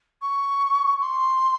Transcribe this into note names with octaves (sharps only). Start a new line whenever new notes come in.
C#6
C6